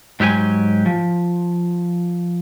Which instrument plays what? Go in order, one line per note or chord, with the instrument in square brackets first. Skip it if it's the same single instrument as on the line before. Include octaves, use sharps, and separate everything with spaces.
[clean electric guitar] G#2 F#3 G4 A#4 G#5
F3